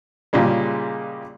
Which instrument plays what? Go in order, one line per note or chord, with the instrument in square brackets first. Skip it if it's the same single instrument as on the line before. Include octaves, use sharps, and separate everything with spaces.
[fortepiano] A#2 C#3 G3 G#3